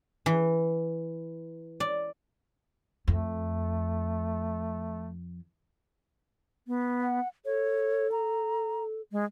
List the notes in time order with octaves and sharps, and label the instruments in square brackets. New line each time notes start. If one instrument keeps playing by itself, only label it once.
[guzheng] E3
D5
[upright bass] F2 [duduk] A3
[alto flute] B3
[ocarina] F#5
[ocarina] A4 [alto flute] C#5
[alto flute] A#5
G#3